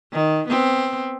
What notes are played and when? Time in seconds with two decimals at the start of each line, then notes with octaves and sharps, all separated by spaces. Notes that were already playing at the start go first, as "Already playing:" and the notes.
0.13 D#3
0.49 B3 C4